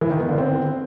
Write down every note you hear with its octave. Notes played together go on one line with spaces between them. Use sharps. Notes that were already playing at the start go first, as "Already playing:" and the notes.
E3
D#3
B3
D3
C4